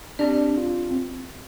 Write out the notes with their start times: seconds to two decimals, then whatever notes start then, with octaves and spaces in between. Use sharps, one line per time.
0.19 C4 D4 G4 D5
0.58 F4
0.91 C4